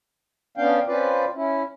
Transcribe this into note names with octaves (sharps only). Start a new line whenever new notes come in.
B3 C#4 D4 F5 G5
C4 C#4 F4 B4 D5
C#4 E4